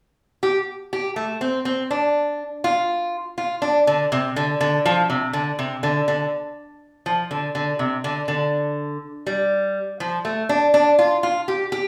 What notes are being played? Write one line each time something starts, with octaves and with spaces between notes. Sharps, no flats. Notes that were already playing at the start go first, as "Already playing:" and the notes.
G4
G4
A3
C4
C4
D4
F4
F4
D4
D3
C3
D3
D3
F3
C3
D3
C3
D3
D3
F3
D3
D3
C3
D3
D3
G3
F3
A3
D4
D4
F4
F4
G4
G4